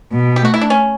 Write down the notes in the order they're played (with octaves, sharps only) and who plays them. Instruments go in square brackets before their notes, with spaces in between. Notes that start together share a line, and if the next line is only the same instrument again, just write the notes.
[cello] B2
[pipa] G4
[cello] A3 [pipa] F#4
[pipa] E4
D4
C#4